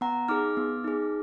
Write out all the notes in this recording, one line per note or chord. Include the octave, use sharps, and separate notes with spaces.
B3 F#5 A#5
D#4 G#4 D6 F6
B3
D#4 G#4